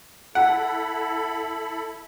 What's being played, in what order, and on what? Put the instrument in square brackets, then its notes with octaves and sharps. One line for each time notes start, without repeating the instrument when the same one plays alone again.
[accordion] E4 A4 B5 [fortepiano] F#5